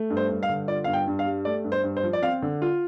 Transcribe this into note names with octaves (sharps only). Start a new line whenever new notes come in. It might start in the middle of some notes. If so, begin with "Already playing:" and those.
Already playing: A3
G2
C5
G2
F5
D3
F4 D5
G2 F5
G5
G2
F5
G3
A3 D5
G2
C5
G2
C5
F3
D5
C4 F5
D3
F4